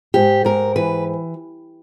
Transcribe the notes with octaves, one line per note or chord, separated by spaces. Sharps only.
G#2 G4
G#2 A#4
E3 B4